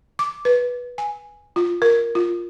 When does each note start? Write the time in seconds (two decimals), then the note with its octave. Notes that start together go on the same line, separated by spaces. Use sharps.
0.19 D6
0.45 B4
0.98 G#5
1.56 F4
1.82 A#4
2.15 F4